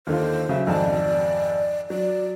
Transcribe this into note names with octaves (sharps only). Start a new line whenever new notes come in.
D#2 D3 F4 C5
C#3 F#3 E5
G#1 F2 D5 A5
F#3 D5